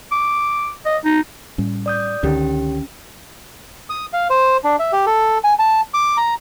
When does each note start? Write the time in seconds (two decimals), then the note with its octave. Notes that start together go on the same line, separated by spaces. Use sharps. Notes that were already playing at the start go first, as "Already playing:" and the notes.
0.12 D6
0.85 D#5
1.05 D#4
1.58 A2 G3 C#4
1.86 D5 D#6 G6
2.23 C#2 D3 D#3 C#4 G4
3.90 D#6
4.13 F5
4.30 C5
4.64 D4
4.79 E5
4.92 G4
5.06 A4
5.44 G#5
5.59 A5
5.94 D6
6.17 A#5